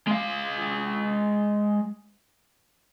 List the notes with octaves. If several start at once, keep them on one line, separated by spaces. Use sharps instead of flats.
G#3 F5